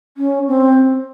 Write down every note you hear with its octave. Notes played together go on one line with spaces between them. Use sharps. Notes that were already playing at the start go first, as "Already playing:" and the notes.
C#4
C4